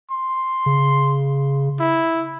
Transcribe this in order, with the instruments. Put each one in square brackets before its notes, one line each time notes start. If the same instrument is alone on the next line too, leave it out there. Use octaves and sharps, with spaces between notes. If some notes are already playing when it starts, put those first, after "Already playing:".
[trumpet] C6
[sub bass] C#3
[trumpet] E4